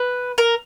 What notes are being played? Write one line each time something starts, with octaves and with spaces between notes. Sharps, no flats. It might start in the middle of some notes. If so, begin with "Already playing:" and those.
Already playing: B4
A#4